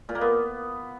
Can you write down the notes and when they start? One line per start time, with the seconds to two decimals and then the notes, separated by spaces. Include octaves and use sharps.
0.09 A#2
0.15 A#3
0.21 B3